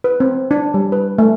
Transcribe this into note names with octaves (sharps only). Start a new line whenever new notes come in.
B4
C4
D4
G3
B4
A3